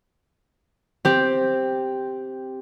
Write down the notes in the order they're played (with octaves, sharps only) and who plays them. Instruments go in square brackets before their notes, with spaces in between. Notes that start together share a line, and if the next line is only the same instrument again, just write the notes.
[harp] C4 G4